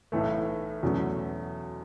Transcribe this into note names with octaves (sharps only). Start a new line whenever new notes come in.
B1 A2 E3 A3
E2 B2 F#3 A3 C#4